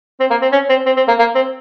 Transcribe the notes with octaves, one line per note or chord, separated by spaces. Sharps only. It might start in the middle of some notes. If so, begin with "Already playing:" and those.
C4
A#3
C4
C#4
C4
C4
C4
A#3
A#3
C4